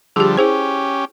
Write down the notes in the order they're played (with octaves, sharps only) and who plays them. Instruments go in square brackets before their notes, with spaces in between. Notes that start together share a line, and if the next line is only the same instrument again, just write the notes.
[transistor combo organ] D3 F3 G3 [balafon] G4 G#4
[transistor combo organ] C#4 G4 [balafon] E4 G#4 C5